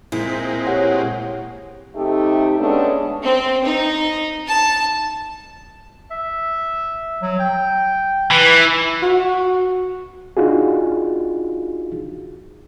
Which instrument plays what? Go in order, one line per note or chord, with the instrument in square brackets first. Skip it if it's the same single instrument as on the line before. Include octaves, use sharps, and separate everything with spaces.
[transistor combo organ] A#2 G#3 C4 [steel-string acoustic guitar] E4
[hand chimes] G4 F#5 [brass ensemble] C#5
[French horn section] C3 A3 D#4 G4
G#3 A3 B3 C#4 D4
[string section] C4
D#4
A5
[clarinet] E5
F#3
G5
[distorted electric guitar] E3 [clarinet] B4
[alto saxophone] F#4
[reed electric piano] D4 D#4 F4 F#4 G#4